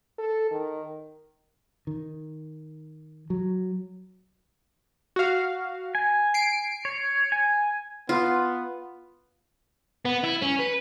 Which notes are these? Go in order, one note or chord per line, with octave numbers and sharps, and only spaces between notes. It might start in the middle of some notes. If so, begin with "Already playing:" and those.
A4
D#3
D#3
F#3
F#4 F5
G#5
C7 D7
C#5
G#5
B3 F4
B3
E4
C#4
B4